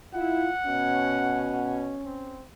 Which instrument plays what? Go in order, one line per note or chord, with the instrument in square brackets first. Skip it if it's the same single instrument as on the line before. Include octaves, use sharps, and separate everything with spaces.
[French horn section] E4 [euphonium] F4 [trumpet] F#5
[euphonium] B2 [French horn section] C#4
[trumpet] C4